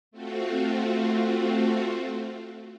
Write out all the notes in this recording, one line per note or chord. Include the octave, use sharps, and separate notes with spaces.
A3 C4 F4 F#4